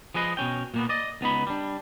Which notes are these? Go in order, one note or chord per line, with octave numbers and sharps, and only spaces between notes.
F3 G#4 B4 D#5
B2 D#3 C#4 G5
A#2 A#3 B3
D5 D#5
C#2 B3 D#4 B5
G3 D4